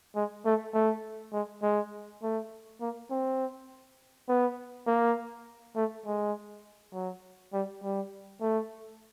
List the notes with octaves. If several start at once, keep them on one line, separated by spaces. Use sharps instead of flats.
G#3
A3
A3
G#3
G#3
A3
A#3
C4
B3
A#3
A3
G#3
F#3
G3
G3
A3